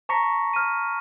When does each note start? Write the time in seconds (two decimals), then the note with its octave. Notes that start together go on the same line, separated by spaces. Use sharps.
0.09 A5 A#5 C#6 A#6 B6 C#7
0.53 F6 D#7